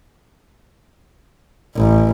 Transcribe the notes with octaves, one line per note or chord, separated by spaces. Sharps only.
A1